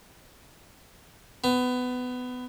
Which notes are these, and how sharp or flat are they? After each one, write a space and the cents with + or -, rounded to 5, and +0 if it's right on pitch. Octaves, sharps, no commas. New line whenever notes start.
B3 +20